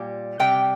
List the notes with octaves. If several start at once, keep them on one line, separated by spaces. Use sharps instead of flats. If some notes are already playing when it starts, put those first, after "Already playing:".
Already playing: A#2 G3
C3 G3 G5